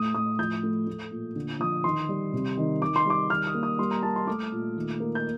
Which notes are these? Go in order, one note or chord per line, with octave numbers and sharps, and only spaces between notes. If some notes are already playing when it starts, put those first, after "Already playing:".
Already playing: A2 A3 D#6
A2 D#6
F3 G6
A3
A3
A#2
D3
F3 D#6
D#3 C6
G3
C3
D#3
D#3 D6
C6
G3 D6
D#3 F6
D#6
A#3
D#6
G3 C6
A#5
A#3 A5
C6
A3 D6
A#2
D#3
A#3
G6